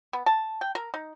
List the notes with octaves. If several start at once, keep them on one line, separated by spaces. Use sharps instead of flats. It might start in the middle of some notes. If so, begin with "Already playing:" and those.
B3
A5
G5
A#4
D#4